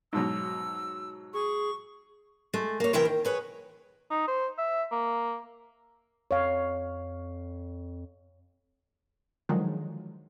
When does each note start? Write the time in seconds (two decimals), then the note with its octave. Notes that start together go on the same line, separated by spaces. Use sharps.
0.13 G#2 B2 F#3 E6
1.34 G#4 C#6
2.54 G#3 A3
2.80 A#3 C#5
2.93 C3 E3 E4 A#4 G5
3.05 D#3
3.25 G#4 B4 C#5
4.11 D#4
4.28 C5
4.58 E5
4.92 A#3
6.31 F2 C#5 F5
9.49 D3 D#3 F3 F#3 G#3